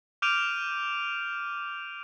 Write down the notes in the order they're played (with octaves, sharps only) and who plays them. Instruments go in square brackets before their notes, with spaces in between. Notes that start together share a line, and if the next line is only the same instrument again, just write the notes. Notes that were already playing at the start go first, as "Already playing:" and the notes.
[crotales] D6 F6 G6 D7 D#7 F7